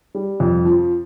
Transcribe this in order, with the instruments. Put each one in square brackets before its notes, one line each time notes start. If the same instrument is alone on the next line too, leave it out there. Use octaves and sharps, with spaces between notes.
[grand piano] G3
F2
F3